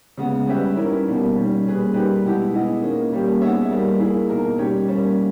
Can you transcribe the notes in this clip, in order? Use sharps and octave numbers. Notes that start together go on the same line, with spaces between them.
C#3 G#3 B3
G3 C#4 G4 B4 E5
D#3 G3 C#4 E4 A#4
B2 G3 A#3 D#4
D#3 G3 C#4
A#2 G3 C#4 G#4 B4
G3 A#3 D#4 G4 B4
B2 G#3 B3 E4 G4
B3 E4 G#4 D#5
D#3 A#3 C#4
A#2 G3 A#3 C#4 G4
B3 D#4 G#4 C#5 E5
G3 A#3 D#4
A#3 E4 G#4
B2 A#3 D#4 A#4
D#3 G3 C#4 G4 C#5
G3 A#3 C#4